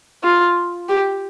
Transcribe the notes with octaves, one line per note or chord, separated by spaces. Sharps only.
F4
G4